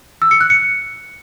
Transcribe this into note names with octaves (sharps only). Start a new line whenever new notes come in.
E6
C#7
F#6
C#7